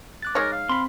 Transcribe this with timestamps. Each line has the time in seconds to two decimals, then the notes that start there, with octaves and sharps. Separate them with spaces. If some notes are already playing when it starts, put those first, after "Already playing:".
0.23 D6 F#6 A6
0.35 G#3 D#4 A#4 C#5
0.53 F5
0.69 C4 B5 C6